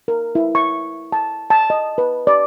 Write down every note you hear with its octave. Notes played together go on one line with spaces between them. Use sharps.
A#4
E4
C#6
A5
A5
D#5
B4
D5